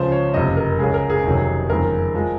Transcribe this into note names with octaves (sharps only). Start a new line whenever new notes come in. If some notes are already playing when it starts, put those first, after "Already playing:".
Already playing: C#2 C#3 F3 C5
C#5
F#1 F2 C3 D#5
A#4
C#2 C#3 G#3 G#4
A#4
G#4
F1 F2 C3 D#3 F#3
F#1 F2 D#3 G#3 A#4
F3 G#3